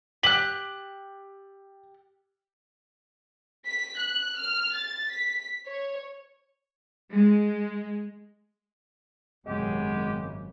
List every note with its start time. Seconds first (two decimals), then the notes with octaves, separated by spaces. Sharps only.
0.23 G4 F#6 F#7
3.66 B6
3.97 F#6
4.37 F6
4.76 A6
5.11 B6
5.66 C#5
7.11 G#3
9.47 G#1 F#2 C#3 G#3 B3 G4